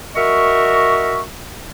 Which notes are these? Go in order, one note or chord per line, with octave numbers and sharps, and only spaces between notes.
F#4 A#4 D#5 E5 C#6